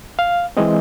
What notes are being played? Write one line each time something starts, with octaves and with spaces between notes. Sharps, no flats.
F5
E3 G#3 C4 D#5